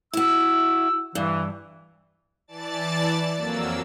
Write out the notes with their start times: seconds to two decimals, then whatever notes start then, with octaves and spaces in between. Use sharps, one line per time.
0.13 E4 F#4 E6
1.15 G2 E3
2.48 E3 D5 A5 A6
3.37 F2 F#3 A#3 E6